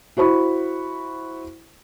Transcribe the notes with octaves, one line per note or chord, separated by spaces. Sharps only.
E4 F#4 C5 B5 C#6